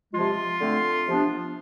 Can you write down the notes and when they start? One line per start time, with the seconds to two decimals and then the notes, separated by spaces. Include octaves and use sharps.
0.13 C3 F3 G#3 F4
0.60 D3 A3 C4
1.07 C3 F3 B3 D4